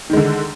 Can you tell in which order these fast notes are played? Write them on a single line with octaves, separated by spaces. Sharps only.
D#3 G#3 D3